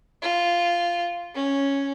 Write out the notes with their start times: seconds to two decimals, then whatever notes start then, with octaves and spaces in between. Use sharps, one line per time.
0.22 F4
1.34 C#4